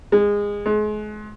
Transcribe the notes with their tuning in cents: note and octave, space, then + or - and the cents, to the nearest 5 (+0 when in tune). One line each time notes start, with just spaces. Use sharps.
G#3 -20
G#3 +35